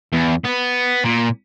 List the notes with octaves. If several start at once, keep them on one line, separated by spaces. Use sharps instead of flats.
E2
B3
A#2